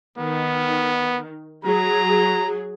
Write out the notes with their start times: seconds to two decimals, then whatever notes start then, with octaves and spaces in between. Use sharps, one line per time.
0.18 D#3 B3
1.65 F#3 G#4 A#5